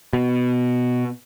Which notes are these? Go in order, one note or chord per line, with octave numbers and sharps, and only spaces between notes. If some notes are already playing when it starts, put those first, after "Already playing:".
B2